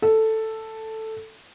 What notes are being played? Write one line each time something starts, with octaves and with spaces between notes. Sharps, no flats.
A4